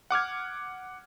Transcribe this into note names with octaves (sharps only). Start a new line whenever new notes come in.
F#5 D6 F6 G#6